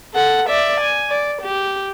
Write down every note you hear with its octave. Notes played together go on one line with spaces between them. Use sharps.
A4 F#5
D5 E5
G#5
D5
G4